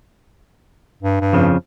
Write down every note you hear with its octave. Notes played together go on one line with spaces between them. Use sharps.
G2
G2
F2 C#3 F3